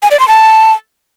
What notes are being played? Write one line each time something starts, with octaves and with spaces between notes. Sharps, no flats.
G#5
D5
C6
A5